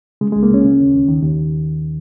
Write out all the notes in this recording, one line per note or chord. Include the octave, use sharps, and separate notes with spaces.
C#3 G#3
G#3
C#2
A#3
C#2 C#4
C#3
D#2
D#2
D#3
D#2